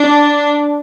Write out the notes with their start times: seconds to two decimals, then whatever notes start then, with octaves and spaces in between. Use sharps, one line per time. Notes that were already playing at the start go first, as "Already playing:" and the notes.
Already playing: D4